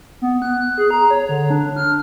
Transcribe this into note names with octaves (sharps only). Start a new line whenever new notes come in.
B3
F#6
G#4
A#5
C#5
D3
D4
F6